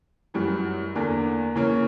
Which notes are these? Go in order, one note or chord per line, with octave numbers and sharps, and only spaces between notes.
F#2 E3 G3
E2 D3 A#3
C#3 E3 A#3 C#4